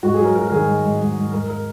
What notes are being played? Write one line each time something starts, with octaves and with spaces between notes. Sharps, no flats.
G#2 F#4
G#4
F#3 A#4
F#3 A#4
A#4
D#3 G#4
G#2
G#2
G#2
G#2
G#2 A#4
A#4